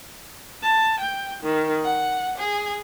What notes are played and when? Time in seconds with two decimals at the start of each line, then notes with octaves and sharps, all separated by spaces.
0.63 A5
1.01 G5
1.42 D#3
1.85 F#5
2.39 G#4